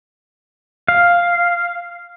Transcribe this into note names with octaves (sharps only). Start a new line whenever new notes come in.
F5